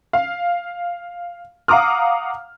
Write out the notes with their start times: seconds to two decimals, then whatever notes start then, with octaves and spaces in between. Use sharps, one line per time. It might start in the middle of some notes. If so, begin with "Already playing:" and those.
0.13 F5
1.68 F5 F#5 A#5 D6 D#6 F6